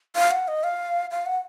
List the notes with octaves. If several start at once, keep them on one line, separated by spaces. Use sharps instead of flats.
F5
F#5
D#5
F5
F5
F#5